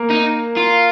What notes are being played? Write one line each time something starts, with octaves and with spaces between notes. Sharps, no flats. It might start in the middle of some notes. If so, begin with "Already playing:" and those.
Already playing: A#3 A#4
D#4
F4